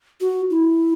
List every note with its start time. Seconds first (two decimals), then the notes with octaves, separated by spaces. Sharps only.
0.21 F#4
0.50 E4